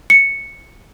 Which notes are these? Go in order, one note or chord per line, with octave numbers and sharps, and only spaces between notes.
C#7